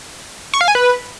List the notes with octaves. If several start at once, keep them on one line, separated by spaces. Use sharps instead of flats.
C#6
F5
G#5
B4